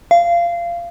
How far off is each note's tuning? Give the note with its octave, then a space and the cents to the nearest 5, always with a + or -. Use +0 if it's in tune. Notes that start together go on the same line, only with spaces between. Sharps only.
F5 -20